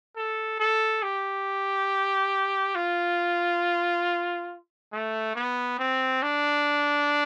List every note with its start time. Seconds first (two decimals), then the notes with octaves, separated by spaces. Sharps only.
0.16 A4
0.60 A4
1.03 G4
2.75 F4
4.93 A3
5.36 B3
5.79 C4
6.22 D4